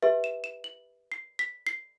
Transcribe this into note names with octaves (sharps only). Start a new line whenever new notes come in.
G4 B4 E5
E7
E7
F#7
C7
B6
C7